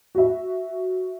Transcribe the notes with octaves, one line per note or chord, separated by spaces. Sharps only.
F#4 E5